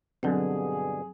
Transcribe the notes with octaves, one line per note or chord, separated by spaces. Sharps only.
G2 B2 D3 F#3 C4 G#4